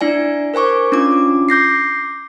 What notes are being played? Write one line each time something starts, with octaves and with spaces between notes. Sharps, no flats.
D4 E4 D5 G#5
A#4 C5 G#5 C#6 D6
C#4 D4 F4 D6
D6 G6 A#6 C7